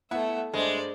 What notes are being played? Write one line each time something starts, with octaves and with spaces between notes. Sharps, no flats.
A3 B3 E4 E5 F#5
G2 G#3 A3 C5 D5